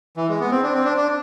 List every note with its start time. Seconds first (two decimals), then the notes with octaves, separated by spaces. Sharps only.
0.17 E3
0.29 G#3
0.40 B3
0.51 C4
0.63 D4
0.74 C4
0.85 D4
0.97 D4